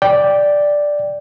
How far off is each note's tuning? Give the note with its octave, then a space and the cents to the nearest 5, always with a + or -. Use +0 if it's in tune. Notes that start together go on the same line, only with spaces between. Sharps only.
D5 +0 G5 +0